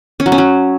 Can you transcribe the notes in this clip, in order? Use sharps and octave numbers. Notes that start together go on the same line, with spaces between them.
C#4
F#3
C#4
F#3